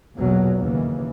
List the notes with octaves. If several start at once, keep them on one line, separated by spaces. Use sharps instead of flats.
A#1 E2 B2 F#3
D#2 C#3 E3